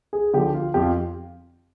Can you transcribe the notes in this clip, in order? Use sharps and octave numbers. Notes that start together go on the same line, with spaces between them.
G#4
D3 F3 G4
F4
F2 G4
F4